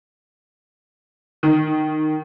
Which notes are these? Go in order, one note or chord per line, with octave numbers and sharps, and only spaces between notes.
D#3